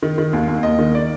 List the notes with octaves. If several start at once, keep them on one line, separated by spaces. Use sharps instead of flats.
D#3
D#3
D#2
D#2
D#2 D#5
D#3
D5